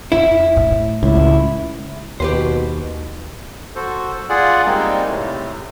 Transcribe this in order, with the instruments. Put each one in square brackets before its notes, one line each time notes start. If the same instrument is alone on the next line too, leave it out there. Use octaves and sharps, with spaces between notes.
[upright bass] F2 [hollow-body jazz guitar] E4
[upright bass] A2
[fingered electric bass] C#2 [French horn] E4
[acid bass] D#2 [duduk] B2 [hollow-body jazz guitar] G4 B4 C5
[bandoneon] F#4 A4 C5
F4 G#4 D5 F#5
G3 G#3 A#3 C4 D#4
A2 C3